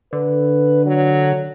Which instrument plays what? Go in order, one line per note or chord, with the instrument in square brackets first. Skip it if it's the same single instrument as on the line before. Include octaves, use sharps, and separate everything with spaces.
[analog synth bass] D3 [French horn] B4
[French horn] F#3